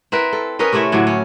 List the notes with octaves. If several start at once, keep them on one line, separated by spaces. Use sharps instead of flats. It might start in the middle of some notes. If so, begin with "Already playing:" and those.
C4 E4 A#4 B4
A4
C#4 A#4 B4 D#5
C3 A3 C#4 E4
A2 D3 F#3
C#4